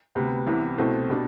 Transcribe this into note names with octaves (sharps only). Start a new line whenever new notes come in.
D2 C3 G3 B3
C2 C3 E3 B3
C2 B2 A3 C4
B2 G3 D4